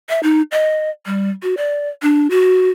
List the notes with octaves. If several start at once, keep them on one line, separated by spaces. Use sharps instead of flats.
E5
D#4
D#5
G3
F#4
D5
D4
F#4